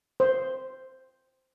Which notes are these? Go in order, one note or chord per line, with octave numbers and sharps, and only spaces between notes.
C5